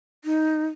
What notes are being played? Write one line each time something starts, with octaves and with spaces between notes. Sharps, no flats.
D#4